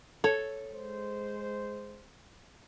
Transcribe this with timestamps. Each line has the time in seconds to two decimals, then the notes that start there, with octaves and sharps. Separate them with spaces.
0.24 A4 C#5
0.71 G#3 C5